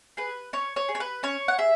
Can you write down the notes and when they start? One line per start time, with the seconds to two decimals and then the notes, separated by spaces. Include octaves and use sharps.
0.17 G#4 B4
0.53 C#4 C#5
0.76 C#5
0.88 G#4
0.95 C#5
1.00 B4
1.23 C#4 C#5
1.48 F#5
1.58 G#4 E5